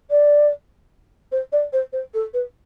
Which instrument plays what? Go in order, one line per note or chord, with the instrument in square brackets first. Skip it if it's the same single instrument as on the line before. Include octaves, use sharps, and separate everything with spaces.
[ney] D5
C5
D5
C5
C5
A4
B4